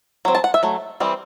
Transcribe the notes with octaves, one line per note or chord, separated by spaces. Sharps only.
F#3 C4
A5
F#5
E5
F#3 A3
E3 G3 C4